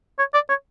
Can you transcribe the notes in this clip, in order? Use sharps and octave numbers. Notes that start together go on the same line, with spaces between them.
C#5
D5
C#5